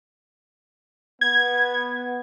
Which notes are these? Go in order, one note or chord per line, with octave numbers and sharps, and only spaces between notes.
B3 G#6